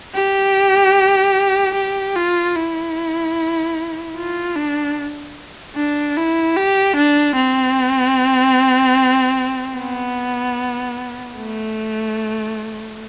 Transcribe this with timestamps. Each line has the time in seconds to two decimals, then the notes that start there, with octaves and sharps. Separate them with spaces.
0.15 G4
1.75 G4
2.16 F4
2.56 E4
4.17 F4
4.56 D4
5.76 D4
6.17 E4
6.56 G4
6.97 D4
7.36 C4
9.77 B3
11.38 A3